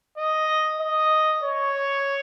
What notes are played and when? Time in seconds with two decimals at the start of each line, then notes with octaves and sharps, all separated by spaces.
0.18 D#5
0.80 D#5
1.43 C#5